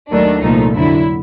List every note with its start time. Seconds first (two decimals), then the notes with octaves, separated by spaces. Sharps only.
0.11 D#2 D#3 F#3 A3 D4
0.43 C2 A#2 F3 A3 D#4
0.75 F2 D3 F#3 E4